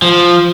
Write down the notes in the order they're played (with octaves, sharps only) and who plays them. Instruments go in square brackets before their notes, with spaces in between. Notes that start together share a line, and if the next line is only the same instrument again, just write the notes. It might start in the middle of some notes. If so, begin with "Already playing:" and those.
[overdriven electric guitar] F3